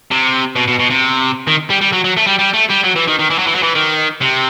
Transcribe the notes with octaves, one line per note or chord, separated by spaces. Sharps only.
C3
B2
B2
B2
C3
D#3
G3
G3
F#3
F#3
A3
G3
G3
A3
G3
F#3
E3
D#3
D#3
E3
F#3
E3
F#3
E3
D#3
C3